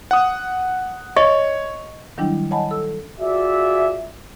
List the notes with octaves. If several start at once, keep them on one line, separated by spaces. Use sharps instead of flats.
F#5 D#6
C#5 D#5 C#6
D#3 F#3 G3 D4 E4 G5
C#5 D#5 F#5 G#5 A5 B5
A4 E6
F4 F#4 G#4 D5 E5